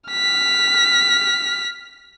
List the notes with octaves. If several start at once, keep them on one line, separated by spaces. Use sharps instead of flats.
F6 B6